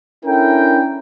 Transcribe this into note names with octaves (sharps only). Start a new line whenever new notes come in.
C#4 D4 E4 A4 A#4 G5